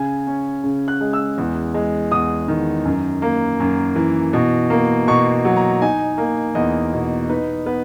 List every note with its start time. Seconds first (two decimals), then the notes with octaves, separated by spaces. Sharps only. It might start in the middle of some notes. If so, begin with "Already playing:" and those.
Already playing: C#3 G#5
0.27 C#4
0.64 C#3
0.88 F#6
1.01 G#3
1.13 E6
1.38 E2
1.74 G#3
2.12 E2 D#6
2.48 D#3
2.85 F#2
3.22 A#3
3.60 F#2
3.96 E3
4.33 B2
4.70 A#3
5.08 B2 C#6
5.45 F#3
5.56 A#5
5.82 D#4 G#5
6.18 A#3
6.55 E2 D#5
6.93 B2
7.29 D#4 B4
7.66 B3 B4